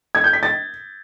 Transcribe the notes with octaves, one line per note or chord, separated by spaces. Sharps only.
G#6
G6
B6
A6